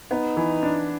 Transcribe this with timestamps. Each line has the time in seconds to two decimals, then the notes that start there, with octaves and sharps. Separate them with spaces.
0.11 B3 D#4
0.37 E3
0.63 D4